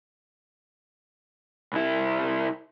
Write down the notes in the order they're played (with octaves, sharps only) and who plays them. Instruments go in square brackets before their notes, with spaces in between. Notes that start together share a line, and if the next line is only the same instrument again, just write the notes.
[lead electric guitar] C2 E4